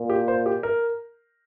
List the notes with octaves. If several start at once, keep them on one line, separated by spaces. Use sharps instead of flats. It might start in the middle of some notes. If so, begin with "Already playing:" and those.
Already playing: A#2
G4
C5
G4
A#4